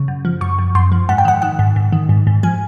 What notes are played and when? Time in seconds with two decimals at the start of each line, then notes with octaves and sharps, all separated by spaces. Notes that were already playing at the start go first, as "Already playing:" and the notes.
Already playing: C#3
0.08 F#2
0.25 F3
0.41 F#2 C#6
0.59 F#2
0.75 F#2 C6
0.92 F3
1.09 G#2 F#5
1.18 G5
1.25 D#3 F#5
1.42 D#3 F#5
1.59 G#2
1.76 G#2
1.93 D#3
2.09 G#2
2.27 G#2
2.43 F3 G#5